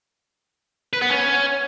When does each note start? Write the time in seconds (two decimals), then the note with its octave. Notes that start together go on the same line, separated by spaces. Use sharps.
0.93 B4
1.02 B3
1.10 C#4